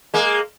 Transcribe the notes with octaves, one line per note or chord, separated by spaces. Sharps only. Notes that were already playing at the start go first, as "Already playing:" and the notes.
G#3 A#3